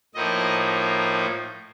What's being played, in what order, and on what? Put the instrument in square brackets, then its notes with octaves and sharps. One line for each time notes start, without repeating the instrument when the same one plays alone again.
[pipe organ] A2 F3 A#3 D#4 D#5